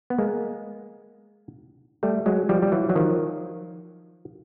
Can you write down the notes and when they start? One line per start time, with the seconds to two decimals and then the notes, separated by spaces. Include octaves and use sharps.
0.10 B3
0.18 G#3 A#3
2.03 G3 A3
2.26 F#3 G#3
2.49 F3 G3
2.62 G3
2.72 E3 F#3
2.89 F#3
2.96 D#3 F3